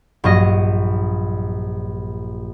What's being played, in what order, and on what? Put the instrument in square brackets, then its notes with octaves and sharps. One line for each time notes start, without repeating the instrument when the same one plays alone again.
[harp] A#1 G2 F#3 D#5 A#6